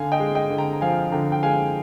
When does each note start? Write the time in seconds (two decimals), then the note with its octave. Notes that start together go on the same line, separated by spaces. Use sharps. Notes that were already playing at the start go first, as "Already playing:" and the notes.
Already playing: D3 F5 G#5
0.12 D#5 G5
0.20 G#3
0.35 D#5 G5
0.50 D3
0.58 G5 A#5
0.73 A#5
0.81 F3 F5 G#5
1.12 D3 G5 A#5
1.32 G5
1.43 G#3 F5 G#5